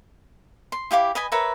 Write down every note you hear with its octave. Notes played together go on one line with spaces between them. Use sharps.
C6
E4 G4 F5 D6
B4 D#5 G#5 B5
A#4 B4 C#5 E5